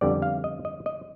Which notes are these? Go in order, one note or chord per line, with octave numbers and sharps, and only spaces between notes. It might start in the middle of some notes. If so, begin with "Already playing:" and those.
F2 D3 G3 B3 D5
F5
D#5
D#5
D#5